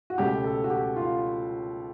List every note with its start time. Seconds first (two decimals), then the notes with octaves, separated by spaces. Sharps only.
0.10 F#4
0.18 C#2 B2 F#3 A3 G4
0.44 A4
0.64 F#4
0.70 G4
0.96 F4